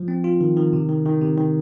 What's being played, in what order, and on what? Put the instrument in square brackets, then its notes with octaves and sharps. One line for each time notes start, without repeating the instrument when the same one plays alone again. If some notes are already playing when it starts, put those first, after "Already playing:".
Already playing: [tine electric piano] F3
C4
F4
D#3
D#3
C3
D#3
D#3
C3
D#3